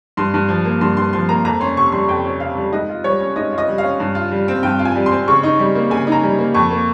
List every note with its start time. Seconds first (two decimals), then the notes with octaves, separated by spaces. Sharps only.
0.17 G2 C6
0.34 G2
0.49 F3
0.65 A#3
0.81 G2 C6
0.97 G2 C6
1.13 F3 C6
1.29 A#3 A#5
1.45 F2 A#5
1.60 C#4 C6
1.77 C3 C#6
1.92 G3 C6
2.08 F2 G5
2.24 C#4
2.40 C3 F5
2.57 G3
2.72 G#2 D#5
2.89 F4
3.04 G3 C#5
3.20 C#4
3.36 G#2 D#5
3.52 F4
3.58 D#5
3.68 G3
3.78 C#4 F5
4.00 G2
4.15 F4
4.32 G3
4.48 C4
4.63 G2 G5
4.79 F4
4.85 G#5
4.96 G3
5.06 C6
5.11 C4
5.28 C#3 C#6
5.43 D#4
5.59 G3
5.75 A#3
5.90 C#3 G#5
6.07 D#4 A#5
6.23 G3
6.38 A#3
6.54 F2 C#6
6.70 A#3